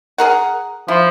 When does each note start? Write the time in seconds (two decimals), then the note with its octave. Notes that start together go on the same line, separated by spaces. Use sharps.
0.18 G#4 A#4 F#5
0.88 F3 E4